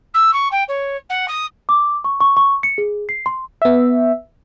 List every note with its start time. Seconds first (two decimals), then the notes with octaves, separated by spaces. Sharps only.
0.14 E6
0.33 C#6
0.51 G5
0.68 C#5
1.09 F#5
1.28 D#6
1.69 D6
2.04 C#6
2.21 C#6
2.37 C#6
2.63 C#7
2.78 G#4
3.09 C7
3.26 C6
3.62 B3 E5